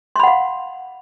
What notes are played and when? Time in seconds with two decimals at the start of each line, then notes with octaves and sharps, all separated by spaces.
0.16 C6
0.19 B5
0.23 F#5
0.27 F5